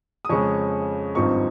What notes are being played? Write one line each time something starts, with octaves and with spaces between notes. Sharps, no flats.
D#6
F2 C#3 G#3 C#4 C#6
G#1 G2 F3 C4 D#4 C#6